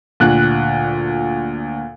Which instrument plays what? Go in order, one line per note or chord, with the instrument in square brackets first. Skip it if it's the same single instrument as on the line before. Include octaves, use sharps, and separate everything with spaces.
[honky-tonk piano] D2 F#6 [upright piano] A#2